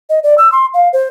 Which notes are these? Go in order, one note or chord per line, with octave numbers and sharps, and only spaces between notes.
D#5
D5
E6
C6
F5
C5